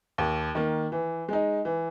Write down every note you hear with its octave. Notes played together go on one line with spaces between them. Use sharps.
D#2
D#3 A#3
E3
G#3 D#4
E3